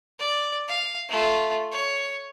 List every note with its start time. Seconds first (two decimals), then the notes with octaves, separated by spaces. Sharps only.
0.19 D5
0.68 F5
1.09 A3 F4
1.72 C#5